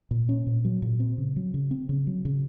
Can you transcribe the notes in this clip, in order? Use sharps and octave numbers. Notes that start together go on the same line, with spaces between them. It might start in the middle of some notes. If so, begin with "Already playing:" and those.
A#2
C#4
A#2
F#3
A#2
C4
C#3
F#3
C#3
C4
C#3
F#3
C#3